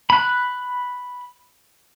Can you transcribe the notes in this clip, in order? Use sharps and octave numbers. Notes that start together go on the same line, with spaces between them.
B5 F#6